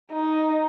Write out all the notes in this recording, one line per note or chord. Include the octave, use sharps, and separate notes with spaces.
D#4